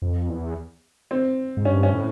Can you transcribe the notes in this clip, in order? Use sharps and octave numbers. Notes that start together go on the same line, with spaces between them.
F2
E2
C4
G#2
G2 C#4
C#4
A2